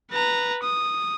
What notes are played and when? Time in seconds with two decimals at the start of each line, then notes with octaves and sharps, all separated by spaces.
0.12 B4 A#5
0.63 D#6